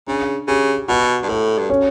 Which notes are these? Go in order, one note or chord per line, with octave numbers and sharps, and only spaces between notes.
C#3 D4
C#3 G4
B2 F#4
G2
A2 A4
G2
C#4